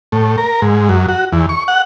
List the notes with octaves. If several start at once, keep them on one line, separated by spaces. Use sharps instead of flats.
A2
A#4
G#2
F#2
F#4
E2
C#6
F#5